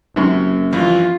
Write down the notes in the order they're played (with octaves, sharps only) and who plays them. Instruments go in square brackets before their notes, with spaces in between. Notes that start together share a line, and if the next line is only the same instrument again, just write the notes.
[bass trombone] F#1 [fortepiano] F#2 C3
[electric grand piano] G2 E3 F3 [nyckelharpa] F4